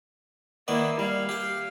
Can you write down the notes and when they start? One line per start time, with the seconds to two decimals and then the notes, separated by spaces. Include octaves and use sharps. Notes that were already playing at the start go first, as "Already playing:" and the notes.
0.68 D#3 A#3 B3 E4 D5
0.99 G3 F5
1.29 G4 G5